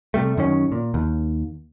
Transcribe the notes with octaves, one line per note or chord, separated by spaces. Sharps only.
C3 G3 A3
F#2 D#3 C#4
A#2
D#2